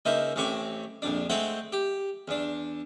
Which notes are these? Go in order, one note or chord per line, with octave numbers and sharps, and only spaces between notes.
C#2 A#3 D#4 C5 E5
A1 A2 C4 C#6 D6
A#1 F2 D4
G#3 A3 C4 C5 F#5 G5
G4
E2 D4